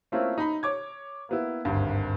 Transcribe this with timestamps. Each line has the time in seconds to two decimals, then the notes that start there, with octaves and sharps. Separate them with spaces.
0.12 A3 A#3 C4 C#4 E4 F4
0.38 D#4 B5
0.63 C#5 D6 G#6
1.29 A#3 B3 E4
1.65 G#1 D2 G2